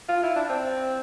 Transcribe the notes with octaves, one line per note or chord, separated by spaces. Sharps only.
F4
E4
D4
C4